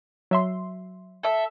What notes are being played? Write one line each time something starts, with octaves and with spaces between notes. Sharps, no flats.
F#3 E5 C6
A4 E5